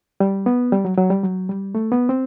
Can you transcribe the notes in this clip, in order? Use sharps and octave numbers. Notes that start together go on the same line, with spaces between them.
G3
B3
G3
F#3
F#3
G3
F#3
G3
A3
B3
C4